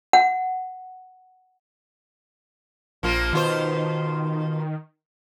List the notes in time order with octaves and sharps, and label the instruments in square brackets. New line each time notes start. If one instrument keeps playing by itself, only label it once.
[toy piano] F#5
[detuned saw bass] A#1 [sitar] F3 A#3 F4
[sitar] B2 F4 C5 [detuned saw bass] D#3